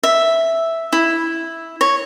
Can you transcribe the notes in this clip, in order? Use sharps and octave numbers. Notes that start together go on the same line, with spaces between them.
E5
E4
C#5